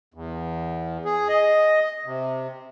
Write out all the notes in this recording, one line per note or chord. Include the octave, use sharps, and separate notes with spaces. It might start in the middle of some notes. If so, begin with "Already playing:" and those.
E2
G#4
D#5
C3